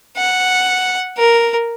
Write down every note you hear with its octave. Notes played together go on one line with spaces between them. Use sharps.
F#5
A#4